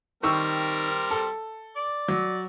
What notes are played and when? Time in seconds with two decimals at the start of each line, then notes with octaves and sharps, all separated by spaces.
0.23 D#3 G3 C4 A#4 C#6 E6
1.11 A4
1.76 D5
2.08 F#3